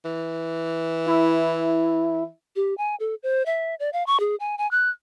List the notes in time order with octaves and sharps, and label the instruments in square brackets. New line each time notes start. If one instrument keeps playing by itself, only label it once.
[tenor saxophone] E3
[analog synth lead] E4
[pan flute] G4
G#5
A4
C5
E5
D5
F5
C#6
G#4
G#5
G#5
F#6